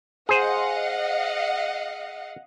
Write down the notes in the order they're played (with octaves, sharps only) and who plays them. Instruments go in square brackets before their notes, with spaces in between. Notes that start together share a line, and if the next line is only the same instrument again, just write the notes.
[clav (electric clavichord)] G#4 C5 [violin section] D#5 F5 F#5